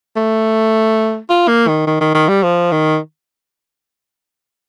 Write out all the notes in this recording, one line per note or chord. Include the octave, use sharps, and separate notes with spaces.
A3
F4
A#3
D#3
D#3
D#3
D#3
G3
F3
D#3